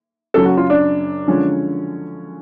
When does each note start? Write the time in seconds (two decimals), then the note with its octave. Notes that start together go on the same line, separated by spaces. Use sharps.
0.34 F#2 C#3 F#3 C#4 A4
0.45 F#4
0.58 F4
0.70 D4
1.28 D3 F3 G#3 C#4